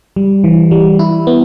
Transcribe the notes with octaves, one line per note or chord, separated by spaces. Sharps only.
G3
E3
G3
E4
B3